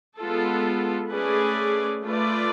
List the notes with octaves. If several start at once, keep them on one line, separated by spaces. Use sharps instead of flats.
G#3 B3 F4 A4
A3 C#4 G#4 B4 D5
A3 F4 B4 D5